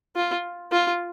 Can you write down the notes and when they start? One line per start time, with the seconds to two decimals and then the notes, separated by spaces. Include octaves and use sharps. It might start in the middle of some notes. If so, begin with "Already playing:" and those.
0.16 F4
0.72 F4